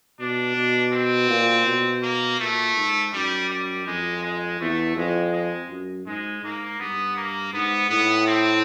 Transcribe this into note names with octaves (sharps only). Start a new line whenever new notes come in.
B2 D4
B2
C4
A#2
B2
A#3
A#2 A3
G#2
F#2 G3
G3
F2 G#3
G#3
E2 A3
F2 G#3
G#3
F#2
G#2 G#3
G#2 A#3
G2 B3
A#3
G#2 B3
A2 B3
C4